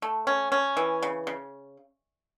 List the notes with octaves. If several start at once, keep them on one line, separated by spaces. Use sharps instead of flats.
A3
C#4
C#4
E3
C#3
C#3